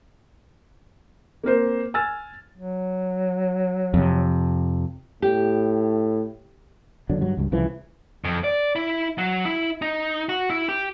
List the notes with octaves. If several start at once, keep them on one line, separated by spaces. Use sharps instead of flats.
A#3 C4 A#4 C5
G#5 E6 F6 A6
F#3
F2 C3
A2 G4
F#1 D3 F#3 D4
G2 F#3
C#2 G2
C2 C#3 E3 F3
F2
D5
E4
F#3
E4
D#4
F#4
E4
G4